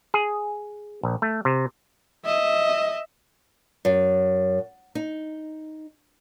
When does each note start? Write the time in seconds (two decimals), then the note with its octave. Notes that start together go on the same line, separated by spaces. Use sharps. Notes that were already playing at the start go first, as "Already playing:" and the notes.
0.14 G#4
1.03 A#1
1.22 A3
1.45 C3
2.25 D#5 E5
3.85 F#2
4.95 D#4